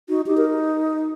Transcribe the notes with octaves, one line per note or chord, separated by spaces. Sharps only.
D#4 F#4
D#4 G4
A#4